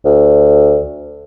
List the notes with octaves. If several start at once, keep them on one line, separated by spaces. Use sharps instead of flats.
D2